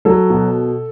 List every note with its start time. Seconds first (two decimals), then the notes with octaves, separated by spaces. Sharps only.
0.05 F#3 A4
0.30 B2